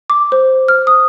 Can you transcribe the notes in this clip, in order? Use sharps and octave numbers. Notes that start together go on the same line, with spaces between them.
D6
C5
F6
D#6